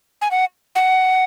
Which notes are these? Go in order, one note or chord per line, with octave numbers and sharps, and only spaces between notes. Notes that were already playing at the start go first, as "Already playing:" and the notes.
G#5
F#5
F#5